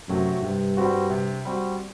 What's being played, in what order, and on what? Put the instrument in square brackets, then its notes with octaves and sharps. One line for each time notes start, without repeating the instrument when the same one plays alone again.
[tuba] F#2 [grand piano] C3 F#3 A3
[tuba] G2 [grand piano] C3
[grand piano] G3 C4 F#4
C3
G3 C4 F#4